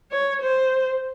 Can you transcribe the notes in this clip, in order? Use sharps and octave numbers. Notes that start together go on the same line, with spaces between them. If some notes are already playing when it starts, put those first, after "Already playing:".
C#5
C5